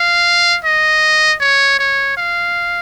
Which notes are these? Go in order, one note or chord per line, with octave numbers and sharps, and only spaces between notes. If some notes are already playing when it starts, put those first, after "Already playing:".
Already playing: F5
D#5
C#5
C#5
F5